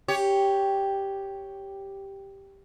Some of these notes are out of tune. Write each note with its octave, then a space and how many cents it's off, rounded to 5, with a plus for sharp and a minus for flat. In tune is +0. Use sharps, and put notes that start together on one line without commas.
G4 +0 C#5 +5